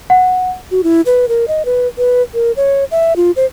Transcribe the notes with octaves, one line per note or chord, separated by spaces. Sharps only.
F#5
F#4
E4
B4
A#4
D#5
B4
B4
A#4
C#5
E5
F4
C5